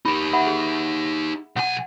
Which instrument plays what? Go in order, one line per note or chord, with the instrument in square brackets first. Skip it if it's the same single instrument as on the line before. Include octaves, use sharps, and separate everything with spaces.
[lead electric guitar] D#4 G4 [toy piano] B5
[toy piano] E5 F#5 B5
G#4
[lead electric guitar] B1 G#5 [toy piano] F#5